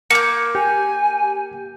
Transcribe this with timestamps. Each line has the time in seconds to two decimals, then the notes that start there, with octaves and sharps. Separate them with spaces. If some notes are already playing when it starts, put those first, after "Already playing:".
0.10 A#3 G6 C#7
0.55 G4 G#5